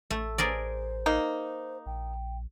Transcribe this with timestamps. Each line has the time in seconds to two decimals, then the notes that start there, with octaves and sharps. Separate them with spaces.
0.10 A1 A3
0.38 G#4 A#4 C5 D5
1.06 A#3 D#4
1.86 A#1 G5